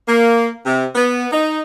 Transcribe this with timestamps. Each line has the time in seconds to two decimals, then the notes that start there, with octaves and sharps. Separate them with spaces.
0.07 A#3
0.66 C3
0.96 B3
1.32 D#4